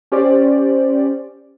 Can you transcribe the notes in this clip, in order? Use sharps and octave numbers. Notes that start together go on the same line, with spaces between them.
C#4 G4 C5 D5